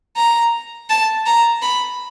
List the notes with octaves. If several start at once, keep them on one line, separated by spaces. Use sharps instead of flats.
A#5
A5
A#5
B5